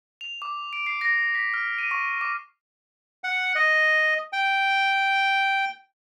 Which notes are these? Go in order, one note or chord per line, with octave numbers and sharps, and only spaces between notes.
F7
D6
D7
C7
A#6
B6
F6
D#7
C#6
D6
F#5
D#5
G5